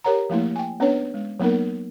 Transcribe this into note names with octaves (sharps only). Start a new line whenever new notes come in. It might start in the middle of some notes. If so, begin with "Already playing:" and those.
G4 A#4 C#5 F#5 A#5
F3 A3 A#3 E4
G5 G#5
B3 C#4 D4 B4 C#5
G#3
F#3 A#3 B3 D#4 A#4